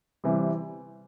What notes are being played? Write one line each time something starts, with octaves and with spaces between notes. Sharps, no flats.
C3 E3 G3